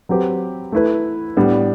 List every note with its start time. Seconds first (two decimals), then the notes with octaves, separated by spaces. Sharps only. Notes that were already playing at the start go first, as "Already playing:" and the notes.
0.09 F#3 C4 G4 B4
0.72 A3 E4 B4
1.37 A2 G3 B3 D4